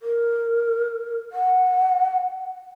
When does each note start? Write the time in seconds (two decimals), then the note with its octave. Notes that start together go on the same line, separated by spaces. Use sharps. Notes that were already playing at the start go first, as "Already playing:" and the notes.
0.02 A#4
1.32 F#5